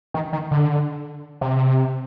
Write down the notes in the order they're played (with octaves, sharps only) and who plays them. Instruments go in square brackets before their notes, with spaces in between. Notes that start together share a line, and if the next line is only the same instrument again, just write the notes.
[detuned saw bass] D#3
D#3
D3
C3